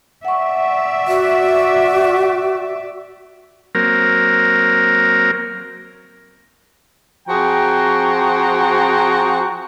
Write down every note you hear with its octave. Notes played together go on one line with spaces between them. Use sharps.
D5 E5 F#5 C#6
F#4
F#3 A#3 C4 A#4
F3 C4 F#4 G#4 G5 A#5